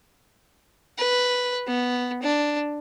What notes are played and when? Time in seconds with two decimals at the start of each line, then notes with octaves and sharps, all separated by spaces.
0.98 B4
1.67 B3
2.23 D4